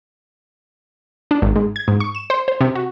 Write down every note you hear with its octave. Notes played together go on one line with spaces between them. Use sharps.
D4
G#1
G#2
G#6
G#2
C#6
E7
C5
C5
C3
F#4